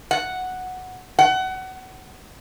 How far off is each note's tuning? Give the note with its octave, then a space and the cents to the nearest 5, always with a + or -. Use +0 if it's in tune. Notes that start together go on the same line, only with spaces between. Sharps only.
F#5 +0
F#5 +25